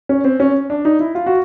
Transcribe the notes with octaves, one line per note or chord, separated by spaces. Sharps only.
C#4
C4
C#4
D4
D#4
E4
F4
F#4